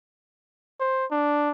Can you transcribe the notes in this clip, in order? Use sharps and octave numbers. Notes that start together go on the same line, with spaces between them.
C5
D4